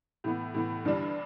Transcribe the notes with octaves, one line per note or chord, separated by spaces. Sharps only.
A2 E3 B3
A2 E3 B3
G1 G2 E3 G3 D4